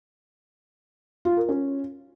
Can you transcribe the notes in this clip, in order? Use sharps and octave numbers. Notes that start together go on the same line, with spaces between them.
F4
A#4
C#4